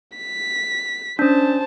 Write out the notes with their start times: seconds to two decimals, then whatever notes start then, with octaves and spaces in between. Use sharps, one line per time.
0.18 B6
1.19 C#4 D4 C5 A5